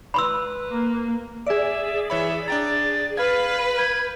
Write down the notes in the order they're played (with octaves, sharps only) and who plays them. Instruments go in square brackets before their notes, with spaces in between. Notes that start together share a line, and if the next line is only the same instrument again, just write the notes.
[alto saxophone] B4 [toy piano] B5 C6 E6
[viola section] A#3
[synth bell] G#4 D5 [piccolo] E5
[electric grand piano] E3 C#5 B5 [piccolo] E5
[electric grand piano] D4 G5 A#5 [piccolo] A6
[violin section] B4 [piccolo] F5 [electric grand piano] G#6
[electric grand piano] G6 [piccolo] G#6